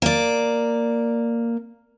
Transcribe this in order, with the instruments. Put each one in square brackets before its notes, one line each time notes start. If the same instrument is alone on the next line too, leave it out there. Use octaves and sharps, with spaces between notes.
[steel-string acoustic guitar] A#3 D5